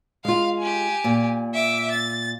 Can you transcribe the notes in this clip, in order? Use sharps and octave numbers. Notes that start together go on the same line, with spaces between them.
G#3 F4 F5
G4 G#5
A#2
E5 D6
A6